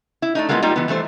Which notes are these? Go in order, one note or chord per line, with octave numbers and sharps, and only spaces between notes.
E4
A3 D4 D#4
G3 G#3 A#3 B3 E4 F4
G3 A#3 D#4 F4 G4
E3 B3
E3 G3 A3 C5